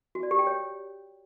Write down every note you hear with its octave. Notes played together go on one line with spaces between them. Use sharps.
F#4
D5
G4
G5
C#5